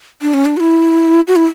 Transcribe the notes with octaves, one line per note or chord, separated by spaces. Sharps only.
D4
C#4
D4
F#4
E4
F#4
E4